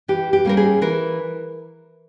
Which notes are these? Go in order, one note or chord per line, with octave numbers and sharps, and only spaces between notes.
E3 G4
G4
G3 A#3 C#4 A#4
G#4
E3 A#4